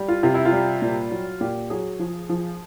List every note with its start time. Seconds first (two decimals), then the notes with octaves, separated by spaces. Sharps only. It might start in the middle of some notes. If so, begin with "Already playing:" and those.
Already playing: G3
0.08 F4
0.23 C3 F4
0.34 E4
0.45 F4
0.52 G3
0.82 A#2
1.11 F#3
1.41 A#2 G4
1.70 F#3 G#4
1.99 F3
2.29 F3